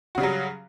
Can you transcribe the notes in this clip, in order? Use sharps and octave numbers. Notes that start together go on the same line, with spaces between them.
C#3 F#3 G3 F#4